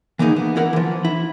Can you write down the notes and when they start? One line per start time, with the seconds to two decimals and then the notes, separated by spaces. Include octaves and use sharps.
0.19 E3 A#3 B3 D#4 G#4
0.36 B3
0.56 E2 E4 A#4 F#5
0.73 E3 F3
1.05 E4